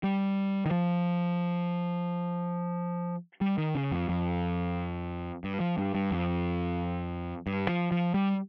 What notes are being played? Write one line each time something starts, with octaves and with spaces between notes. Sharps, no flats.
G3
D#3
F3
G3
D#3
C#3
F2
F2
G2
F3
G2
G2
F2
G2
F3
F3
G3